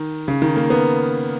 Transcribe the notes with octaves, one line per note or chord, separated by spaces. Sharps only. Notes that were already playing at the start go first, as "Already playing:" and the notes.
Already playing: D#3
C#3
D#3
A#3
B3